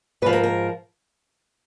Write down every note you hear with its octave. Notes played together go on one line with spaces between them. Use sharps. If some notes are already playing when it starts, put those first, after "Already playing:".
G#2 F3 B4
A#4
A#4